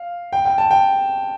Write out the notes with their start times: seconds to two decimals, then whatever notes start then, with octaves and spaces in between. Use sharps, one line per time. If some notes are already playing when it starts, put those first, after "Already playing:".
Already playing: F5
0.33 G5
0.45 G5
0.58 A5
0.71 G5